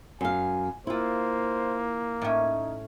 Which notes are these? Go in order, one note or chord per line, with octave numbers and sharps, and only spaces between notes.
F#2 F5 G#5
A#3 E4 F4 C5
A2 C#4 D#4